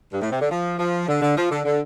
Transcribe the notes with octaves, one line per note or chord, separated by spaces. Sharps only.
G2
A2
C3
D3
F3
F3
D3
D3
F3
D3
D3